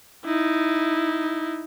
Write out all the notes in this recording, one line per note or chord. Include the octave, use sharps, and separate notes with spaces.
D#4 E4